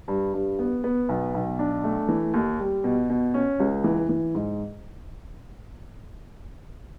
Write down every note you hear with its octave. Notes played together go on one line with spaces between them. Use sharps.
G2
G2
B3
B3
B1
B1
D4
A3
E3
D#2
G3
B2
B2
C#4
C#2
E3
E3
G#2